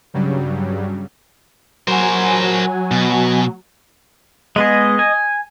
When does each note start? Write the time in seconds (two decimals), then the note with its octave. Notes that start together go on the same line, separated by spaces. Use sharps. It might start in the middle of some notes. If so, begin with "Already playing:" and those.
0.14 G2 C#3 F#3 G3
1.88 F#3 F#4 A#4 C5 G#5
2.91 B2
4.56 G#3 B3 G#4 D#5
4.99 G#5